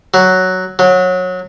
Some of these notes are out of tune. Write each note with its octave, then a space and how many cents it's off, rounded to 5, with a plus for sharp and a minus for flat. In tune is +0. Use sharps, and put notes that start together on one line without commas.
F#3 +5
F#3 -20